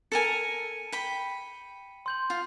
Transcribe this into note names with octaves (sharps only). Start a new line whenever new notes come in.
A4 A#4 G#5 C#7 D#7
G5 B5
C6 G6 F#7
F4